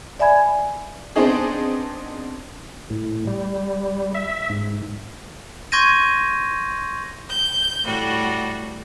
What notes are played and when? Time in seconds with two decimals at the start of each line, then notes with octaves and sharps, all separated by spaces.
0.19 D5 E5 G#5 B5 G#6
1.16 B3 C4 D4 D#4 G#4
2.90 A2
3.27 G3
4.14 E5
4.50 G#2
5.72 C6 C#6 G6 G#6 A#6 D#7
7.28 G6
7.84 A2 G3 F#4